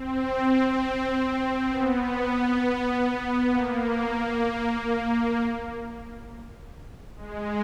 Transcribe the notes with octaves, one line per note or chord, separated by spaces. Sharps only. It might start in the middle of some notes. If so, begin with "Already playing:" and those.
Already playing: C4
B3
A#3
G#3